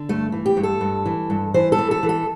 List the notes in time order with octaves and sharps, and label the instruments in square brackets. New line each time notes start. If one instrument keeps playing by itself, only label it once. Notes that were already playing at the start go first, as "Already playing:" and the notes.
Already playing: [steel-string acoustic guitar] D3
G2 A3
E3
G4
G2
A4
G2
E3
G2
E3 C5
A4
E3
A4
E3
A4